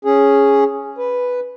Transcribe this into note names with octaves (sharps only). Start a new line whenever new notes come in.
C#4 G#4
B4